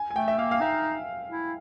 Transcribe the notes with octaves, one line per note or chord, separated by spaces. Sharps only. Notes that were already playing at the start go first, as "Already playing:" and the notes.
Already playing: G#5
G#5
A3 G5
E5
A#3 F5
F5
D#4 E5
E4